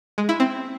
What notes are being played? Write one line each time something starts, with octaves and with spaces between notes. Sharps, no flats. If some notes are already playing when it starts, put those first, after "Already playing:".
G#3
E4
C4